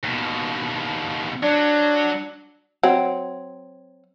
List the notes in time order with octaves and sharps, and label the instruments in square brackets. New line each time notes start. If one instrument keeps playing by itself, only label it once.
[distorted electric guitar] D#2 B2
[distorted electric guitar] F#3 [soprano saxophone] D4
[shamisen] F#3 C4